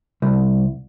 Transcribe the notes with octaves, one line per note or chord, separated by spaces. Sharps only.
C2